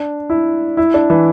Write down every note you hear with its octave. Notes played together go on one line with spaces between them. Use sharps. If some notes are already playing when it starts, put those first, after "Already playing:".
Already playing: D4
E4
E4
D4
E3